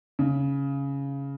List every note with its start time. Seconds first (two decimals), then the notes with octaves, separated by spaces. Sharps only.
0.19 C#3